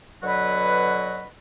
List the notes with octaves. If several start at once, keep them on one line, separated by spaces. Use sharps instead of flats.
B2 D3 F#3 F#4 B4